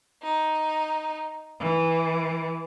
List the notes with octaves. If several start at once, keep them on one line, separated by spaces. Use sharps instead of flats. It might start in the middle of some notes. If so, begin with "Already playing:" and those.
D#4
E3